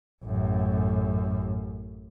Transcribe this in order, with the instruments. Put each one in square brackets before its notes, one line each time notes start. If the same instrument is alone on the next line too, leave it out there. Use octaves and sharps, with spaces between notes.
[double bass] A1 F#2